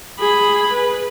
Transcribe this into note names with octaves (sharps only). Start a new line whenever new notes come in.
G#4 B5
B4